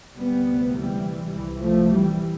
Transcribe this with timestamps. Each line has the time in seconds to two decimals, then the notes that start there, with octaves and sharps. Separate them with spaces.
0.17 D2 C3 G3 B3
0.75 E3 G3
1.32 C2 C3 E3
1.61 F3 A3
1.90 E3 G3